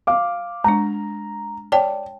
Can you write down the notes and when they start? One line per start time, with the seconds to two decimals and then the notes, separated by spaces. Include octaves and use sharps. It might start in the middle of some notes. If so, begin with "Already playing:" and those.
0.07 F5 D6
0.64 G#3 D4 A#5
1.72 C#5 D5 G5 A5